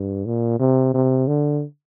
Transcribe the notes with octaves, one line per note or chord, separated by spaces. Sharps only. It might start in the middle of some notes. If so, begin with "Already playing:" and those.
Already playing: G2
A#2
C3
C3
D3